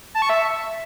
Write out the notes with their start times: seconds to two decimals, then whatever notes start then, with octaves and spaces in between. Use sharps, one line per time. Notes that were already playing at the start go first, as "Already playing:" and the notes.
0.15 A5
0.22 C#6
0.30 E5